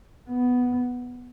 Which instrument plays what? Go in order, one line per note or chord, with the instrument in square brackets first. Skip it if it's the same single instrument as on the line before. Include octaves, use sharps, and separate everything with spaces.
[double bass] B3